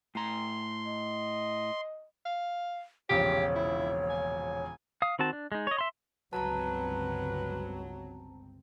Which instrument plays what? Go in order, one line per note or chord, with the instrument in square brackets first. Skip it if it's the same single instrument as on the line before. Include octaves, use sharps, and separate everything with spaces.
[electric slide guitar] A2 A#5 [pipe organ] C6
[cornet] D#5
[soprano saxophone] F5
[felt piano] E1 A#1 C#3 [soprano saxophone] G4 [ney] C#5
[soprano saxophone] E4
G#5
[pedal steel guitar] F5 D#6
D#3 C4 F#4 A5
D4
G#3 D#4
C#5 D#5
E5 C6
[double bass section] G1 C#2 C4 [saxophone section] F#3 [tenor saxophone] B4 [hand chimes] A5 A#5